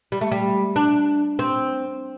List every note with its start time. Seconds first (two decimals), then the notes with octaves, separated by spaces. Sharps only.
0.12 G3
0.21 A3
0.32 G3
0.76 D4
1.39 C4